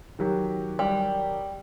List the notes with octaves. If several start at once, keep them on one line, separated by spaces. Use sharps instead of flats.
D#3 F#3 G4
G3